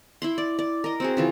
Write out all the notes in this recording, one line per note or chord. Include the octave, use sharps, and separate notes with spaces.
E4 B5 C6
D5
D5
A#4 D#5
C4 F#4 G#4
C#3 E3 F4